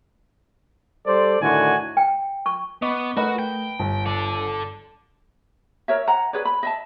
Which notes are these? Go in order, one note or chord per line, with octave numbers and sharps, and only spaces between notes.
G3 A4 C5 D5
A2 D3 D#3 F#4 G#5
G5
C#6
B3 D#5 C#6 D6
A3 F#4 A#4 B4 D#5
G5
G1 G2
A4 D5
A#4 C#5 E5
F#5 A#5
G#4 B4 C#5 D5
B5
D#5 E5 A5